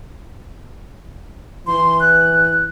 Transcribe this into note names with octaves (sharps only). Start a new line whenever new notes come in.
E3 C6
F#6